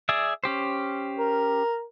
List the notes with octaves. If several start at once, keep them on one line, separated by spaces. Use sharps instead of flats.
G#4 D5 E5
C#4 G4 C5
A#4